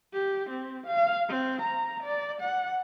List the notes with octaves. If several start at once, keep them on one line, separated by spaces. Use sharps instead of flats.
G4
C4
F5
C4
A#5
D5
F#5